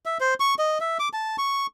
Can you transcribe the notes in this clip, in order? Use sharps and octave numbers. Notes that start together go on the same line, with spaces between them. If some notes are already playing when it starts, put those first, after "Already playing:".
E5
C5
C#6
D#5
E5
D6
A5
C#6